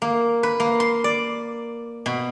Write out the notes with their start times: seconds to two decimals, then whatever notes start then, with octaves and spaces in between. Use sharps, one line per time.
0.02 A#3
0.43 B4
0.60 A#3
0.80 C6
1.04 D5
2.06 B2